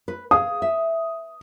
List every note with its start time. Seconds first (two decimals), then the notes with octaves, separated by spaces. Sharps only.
0.08 B4
0.31 G#4 F5 D#6
0.62 E5